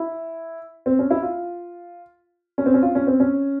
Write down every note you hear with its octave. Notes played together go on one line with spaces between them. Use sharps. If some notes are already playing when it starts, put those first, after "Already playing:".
Already playing: E4
C4
C#4
E4
F4
C#4
C4
C#4
F4
C#4
C4
C#4